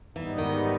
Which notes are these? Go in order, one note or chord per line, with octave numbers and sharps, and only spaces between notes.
G#2 E3 G3 B3 D#4
D#3